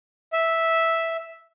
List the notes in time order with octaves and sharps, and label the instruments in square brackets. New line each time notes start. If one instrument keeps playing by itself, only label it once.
[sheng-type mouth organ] E5